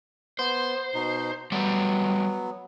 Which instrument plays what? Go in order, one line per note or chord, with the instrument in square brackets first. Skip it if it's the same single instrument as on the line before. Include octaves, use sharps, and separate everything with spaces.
[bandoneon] B3 [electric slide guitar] C5
[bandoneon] B2 D#4
[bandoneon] F#3 B3 [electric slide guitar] G3 A3